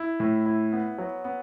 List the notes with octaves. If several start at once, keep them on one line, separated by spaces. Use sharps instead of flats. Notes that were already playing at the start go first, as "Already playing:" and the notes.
Already playing: E4
A2
E4
B3
F#3
B3